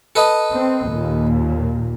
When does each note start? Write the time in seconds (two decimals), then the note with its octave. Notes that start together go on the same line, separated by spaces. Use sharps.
0.16 A4 B4 D#5
0.52 C4
0.85 D#2 A#2